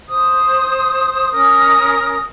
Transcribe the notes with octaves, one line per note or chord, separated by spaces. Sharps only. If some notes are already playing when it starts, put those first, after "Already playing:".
C5 D#6
C#4 A#4 D#6